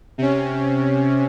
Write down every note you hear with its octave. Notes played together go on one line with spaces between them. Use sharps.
C3 C#4